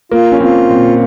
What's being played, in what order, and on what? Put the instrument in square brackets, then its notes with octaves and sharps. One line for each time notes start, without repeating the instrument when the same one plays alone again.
[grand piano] A#3 [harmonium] F4
[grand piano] C#4
[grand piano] C4 [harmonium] F4
[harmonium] A#2 [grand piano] C4